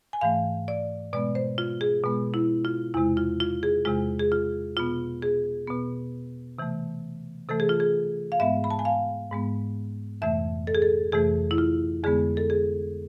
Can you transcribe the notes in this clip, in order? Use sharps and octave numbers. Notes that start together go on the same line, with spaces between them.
G#5
G#2 E3 A3 F5
D5
B2 G#3 B3 D5
C5
F4
G#4
B2 G#3 B3
E4
F4
E2 C3 G#3 E4
F4
F4
G#4
E2 C3 G#3 F4
G#4
F4
B2 B3 F4
G#4
B2 B3
C3 E3 A3
C3 E3 A3 A4
G#4
F4
G#4
F5
G#2 G#3 B3 E5
B5
A5
G#5
F5
G#2 G#3 B3
F2 C3 E3 A3 E5
A4
G#4
A4
F2 C3 E3 A3 G#4
E4
F4
F2 D3 G#3 B3 G#4
A4
G#4